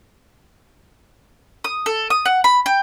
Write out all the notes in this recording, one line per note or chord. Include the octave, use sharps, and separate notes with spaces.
D#6
A4
D#6
F#5
B5
G5